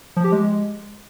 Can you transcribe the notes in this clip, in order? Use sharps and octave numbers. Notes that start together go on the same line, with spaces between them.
F3
G4
G#3